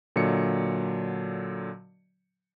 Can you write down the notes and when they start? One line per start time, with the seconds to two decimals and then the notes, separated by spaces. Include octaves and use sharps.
0.16 A#2 D3 F#3 D#5 C#7